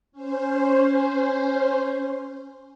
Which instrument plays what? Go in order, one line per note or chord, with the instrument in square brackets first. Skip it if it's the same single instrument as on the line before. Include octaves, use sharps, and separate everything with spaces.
[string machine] C#4 C5